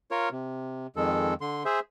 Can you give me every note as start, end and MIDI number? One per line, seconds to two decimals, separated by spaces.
0.11 0.29 65
0.11 0.29 70
0.11 0.29 73
0.32 0.87 48
0.96 1.34 41
0.96 1.34 51
0.96 1.34 56
0.96 1.34 69
1.41 1.63 50
1.41 1.63 84
1.65 1.80 68
1.65 1.80 72
1.65 1.80 76